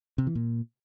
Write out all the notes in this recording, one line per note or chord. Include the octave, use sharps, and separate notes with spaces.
C3
E3
A#2